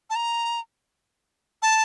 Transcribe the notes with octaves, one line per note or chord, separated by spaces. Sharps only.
A5
A#5
A5